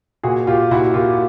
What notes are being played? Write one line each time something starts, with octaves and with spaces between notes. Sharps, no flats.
A#2 F#4 G#4
A#2 F4 G4
A#2 E4 F#4
A#2 F4 G4